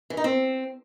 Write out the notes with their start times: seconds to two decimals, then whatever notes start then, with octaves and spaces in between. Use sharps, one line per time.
0.10 E3
0.17 D#4
0.24 C4